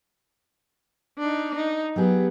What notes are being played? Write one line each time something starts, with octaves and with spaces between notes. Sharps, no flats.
D4 D#4
D#4
F#3 B3 G4 G#4